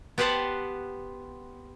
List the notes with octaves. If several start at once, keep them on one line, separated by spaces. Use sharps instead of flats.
B3 G4 B4 C5 F#5 A5